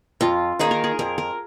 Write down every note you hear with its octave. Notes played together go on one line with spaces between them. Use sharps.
F2 F4
D#3 A#3 D#4 G#4
A#4
G#4
F2 A#4
A#4